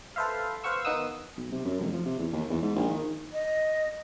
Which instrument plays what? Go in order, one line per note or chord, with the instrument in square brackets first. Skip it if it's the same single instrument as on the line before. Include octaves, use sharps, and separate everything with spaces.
[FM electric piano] A4 B4 C5 E5 F5
B4 C5 F5 F#5 C#6 E6
D#3 B3 D#4 F#5 D#6 E6
[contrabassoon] B1
C3
F#2
F1
F3
C3
E2
D#2
E2
G#2
A#1
D#3
[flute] D#5